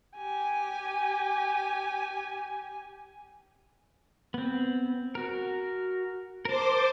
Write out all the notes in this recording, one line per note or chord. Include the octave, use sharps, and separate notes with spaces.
G4 G#5
B3 C4
F#4 A#4
A#4 C5 A5 D6